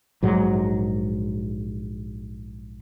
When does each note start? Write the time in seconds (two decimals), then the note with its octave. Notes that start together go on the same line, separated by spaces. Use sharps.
0.23 A#1 G#2 F#3